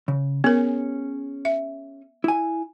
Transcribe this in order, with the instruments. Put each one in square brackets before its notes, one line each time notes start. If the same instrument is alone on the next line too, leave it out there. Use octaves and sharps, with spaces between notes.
[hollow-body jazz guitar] C#3
[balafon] B3 A#4 [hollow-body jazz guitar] C#4 G#4 C#5
[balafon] E5
[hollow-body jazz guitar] E4 G#5